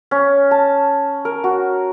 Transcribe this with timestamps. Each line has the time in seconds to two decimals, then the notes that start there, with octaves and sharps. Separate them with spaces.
0.11 C#4
0.51 A5
1.25 A#4
1.44 F#4